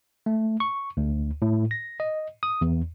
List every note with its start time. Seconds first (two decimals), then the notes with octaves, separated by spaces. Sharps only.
0.26 A3
0.60 C#6
0.97 D2
1.42 A2
1.71 A#6
2.00 D#5
2.43 D#6
2.61 E2